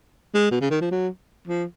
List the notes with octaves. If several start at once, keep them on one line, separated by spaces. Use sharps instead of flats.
G#3
B2
C#3
D#3
F3
F#3
F3